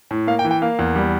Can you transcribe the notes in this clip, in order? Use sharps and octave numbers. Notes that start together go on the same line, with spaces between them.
A2
A#3 F5
G5
E3
G5
A#3 F5
E2
G3